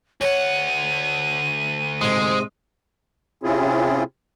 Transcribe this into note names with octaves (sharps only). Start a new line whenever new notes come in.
D2 C#5 F#5 D#7
G#2 C3 G#3
C3 C4 C#4 E4 F4 G#4